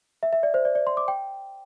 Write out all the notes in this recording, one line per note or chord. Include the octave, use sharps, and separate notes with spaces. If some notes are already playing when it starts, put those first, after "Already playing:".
E5
E5
D5
C5
D5
D5
C6
D6
G5